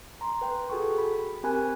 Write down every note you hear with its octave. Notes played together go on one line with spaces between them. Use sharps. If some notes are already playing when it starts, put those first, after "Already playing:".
A#5 C6
B4 G5
F#4 G#4 A4 G5 C#6
B5
C4 G4 A#4 G#5 B5 F#6